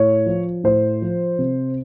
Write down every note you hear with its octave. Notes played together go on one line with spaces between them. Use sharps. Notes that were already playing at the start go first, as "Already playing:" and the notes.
Already playing: A2 C#5
F3
A2 C5
F3
C3